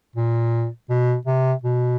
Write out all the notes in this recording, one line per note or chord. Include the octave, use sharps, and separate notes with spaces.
A#2
B2
C3
B2